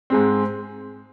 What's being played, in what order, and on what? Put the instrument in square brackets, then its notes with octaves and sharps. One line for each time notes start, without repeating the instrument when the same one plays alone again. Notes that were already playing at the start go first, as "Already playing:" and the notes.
[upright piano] G#2 G#3 C4